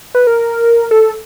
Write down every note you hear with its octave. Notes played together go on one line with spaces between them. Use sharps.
B4
A#4
A4